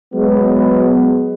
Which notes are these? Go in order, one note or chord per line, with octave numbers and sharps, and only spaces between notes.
F#3 G#3 B3